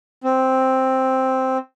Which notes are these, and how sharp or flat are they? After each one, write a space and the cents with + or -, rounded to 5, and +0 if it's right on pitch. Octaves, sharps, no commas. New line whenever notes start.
C4 +0